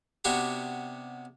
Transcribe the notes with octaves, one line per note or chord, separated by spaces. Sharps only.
C3 B3 D4 E4 F#4 G4